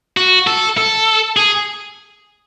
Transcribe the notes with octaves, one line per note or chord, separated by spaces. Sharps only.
F#4
A4
A4
G#4